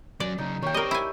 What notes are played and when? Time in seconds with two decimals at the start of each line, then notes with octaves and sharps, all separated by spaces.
0.20 F#3 C#4 D5
0.38 F#2 C#3 D#4
0.62 D#3 A#3 C#5 G5
0.74 G3 C4 A#4 D#5
0.91 E4 G#5